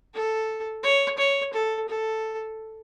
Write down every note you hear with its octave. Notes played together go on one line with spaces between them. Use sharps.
A4
C#5
C#5
A4
A4